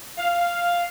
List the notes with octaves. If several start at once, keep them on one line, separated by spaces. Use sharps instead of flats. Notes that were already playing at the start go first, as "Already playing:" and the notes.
F5